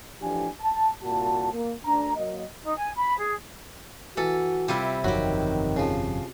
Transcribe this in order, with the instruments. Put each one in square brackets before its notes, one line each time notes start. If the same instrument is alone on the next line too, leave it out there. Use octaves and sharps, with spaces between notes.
[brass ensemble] A2 E3 F3 D4 G4 G#5
A5
C2 A#2 F#4 A5
A#3
D2 D4 A#5
F#3 A#3 D#5
[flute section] D#4
G#5
B5
G#4
[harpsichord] E3 [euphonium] F#4 [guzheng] A4
[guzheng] C3 G3 E4 [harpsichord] F4 G4
[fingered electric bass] G1 F2 C3 [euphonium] D#3 [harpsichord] F#3 [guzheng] F#4 G4
[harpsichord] C#3 F3